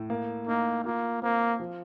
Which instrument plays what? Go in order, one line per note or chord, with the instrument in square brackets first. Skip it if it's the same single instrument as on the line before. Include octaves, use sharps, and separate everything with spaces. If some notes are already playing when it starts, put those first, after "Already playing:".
Already playing: [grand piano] A2
A#3
[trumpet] A#3 [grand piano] D#4
[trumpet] A#3 [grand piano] F4
[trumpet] A#3 [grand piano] C4
[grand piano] F3